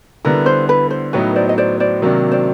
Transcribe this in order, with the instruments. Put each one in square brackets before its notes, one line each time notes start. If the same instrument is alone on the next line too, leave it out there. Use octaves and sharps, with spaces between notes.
[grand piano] D3 G3 B3 E4 [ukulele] A#4
[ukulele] C5
B4
C5
[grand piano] A2 F#3 B3 D#4 [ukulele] B4 C#5
[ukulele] C5 D5
D#5
C5 D5
C5 D5
[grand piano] C3 D#3 F#3 A#3 D4
[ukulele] C5 D5